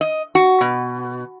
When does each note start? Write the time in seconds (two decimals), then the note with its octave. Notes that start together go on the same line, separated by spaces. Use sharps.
0.01 D#5
0.35 F#4
0.61 B2